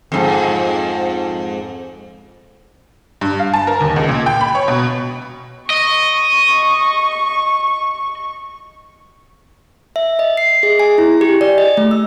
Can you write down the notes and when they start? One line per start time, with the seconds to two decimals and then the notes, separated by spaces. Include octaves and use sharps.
0.12 F2 G#2
3.21 G2
3.40 F5
3.54 A5
3.67 A#4
3.80 D#2
3.96 C#2
4.08 A#2
4.26 G5
4.41 B5
4.55 C#5
4.68 B2
5.70 D#5 C#6
9.96 E5
10.19 D#5
10.37 C7
10.63 G#4
10.80 G#5
10.98 E4
11.21 G4
11.41 D5
11.58 D#5
11.77 A3
11.91 E6